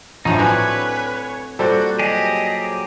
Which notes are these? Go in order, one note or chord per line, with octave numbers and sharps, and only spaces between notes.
A#1 A2 F3 F#3 A3 D#4
F#3 C4 D4 B4 C#5 G#5
A#2 G3 F#4 A4 C5 D5
F#3 G4 G#4 D#5